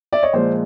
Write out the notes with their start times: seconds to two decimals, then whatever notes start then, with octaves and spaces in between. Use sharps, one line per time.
0.13 D5 E5
0.23 C#5 D#5
0.33 A#2 F3 G#3 C5 D5